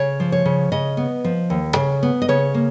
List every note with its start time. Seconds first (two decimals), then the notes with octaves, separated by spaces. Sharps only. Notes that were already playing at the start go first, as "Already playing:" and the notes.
Already playing: C#3 C#5
0.20 F3
0.32 C#5
0.45 C#3
0.72 C#3 D#5
0.97 B3
1.24 F3
1.50 D#2
1.76 C#3
2.03 B3
2.22 D#5
2.28 C#3 C#5
2.54 A#3